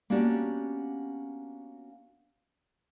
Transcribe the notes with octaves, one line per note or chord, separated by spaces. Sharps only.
A#3 B3 C#4 D4 F#4 G4